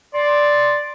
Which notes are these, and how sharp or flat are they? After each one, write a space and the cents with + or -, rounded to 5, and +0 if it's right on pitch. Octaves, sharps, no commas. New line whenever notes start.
D5 +0 C6 +0